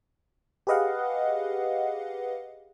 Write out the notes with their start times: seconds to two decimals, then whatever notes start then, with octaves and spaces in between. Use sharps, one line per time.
0.67 G4 G#4 B4 D#5 F5 F#5